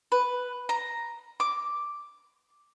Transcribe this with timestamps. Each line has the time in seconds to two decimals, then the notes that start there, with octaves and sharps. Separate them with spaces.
0.12 B4
0.69 A#5
1.40 D6